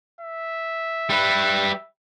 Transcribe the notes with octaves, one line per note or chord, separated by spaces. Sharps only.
E5
G3 B4